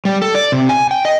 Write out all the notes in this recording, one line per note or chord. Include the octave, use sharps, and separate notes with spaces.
G3
A4
D5
C3
G#5
G5
D#5